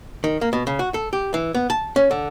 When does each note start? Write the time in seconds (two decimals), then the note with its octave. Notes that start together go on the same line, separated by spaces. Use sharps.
0.24 D#3
0.41 A#3
0.53 B2
0.67 C#3
0.79 F#4
0.94 A4
1.13 G4
1.34 E3
1.55 B3
1.70 A5
1.96 C#4
2.11 D3